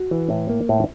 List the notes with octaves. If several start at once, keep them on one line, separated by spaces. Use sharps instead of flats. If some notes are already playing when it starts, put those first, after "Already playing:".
Already playing: F#4
E3
A2
A#3
A2